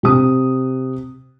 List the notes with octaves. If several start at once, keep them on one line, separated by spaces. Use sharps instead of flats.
C3 D#6